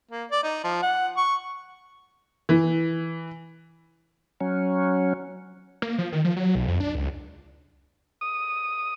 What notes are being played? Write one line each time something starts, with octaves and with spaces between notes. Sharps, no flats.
A#3
D5
D#4
F3
F#5
C#6
E3
F#3 C#4
A#3
F3
D#3
F3
F#3
B1
F2
D4
C#2
D#6